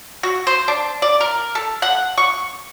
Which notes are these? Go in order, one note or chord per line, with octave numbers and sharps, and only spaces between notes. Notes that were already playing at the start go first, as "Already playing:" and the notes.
F#4
C5
D4
D5
A#4
A4
F#5
C#6